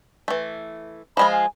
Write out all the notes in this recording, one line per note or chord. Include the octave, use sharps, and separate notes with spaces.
E3 A3
F3 G#3 F4 B5
G#5